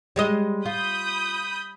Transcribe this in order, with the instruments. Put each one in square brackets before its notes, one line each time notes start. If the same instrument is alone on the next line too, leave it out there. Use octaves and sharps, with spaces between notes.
[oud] G3 G#3 D#5
[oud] F4 [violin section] B5 D#6 G6